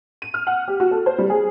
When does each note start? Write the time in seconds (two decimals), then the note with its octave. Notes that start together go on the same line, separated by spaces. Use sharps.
0.22 D#7
0.34 F6
0.47 F#5
0.68 G4
0.80 F#4
0.91 A4
1.06 C5
1.18 G3
1.30 G#4